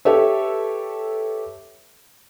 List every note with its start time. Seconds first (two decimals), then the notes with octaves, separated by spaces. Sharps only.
0.05 G4 A4 B4 C#5 E5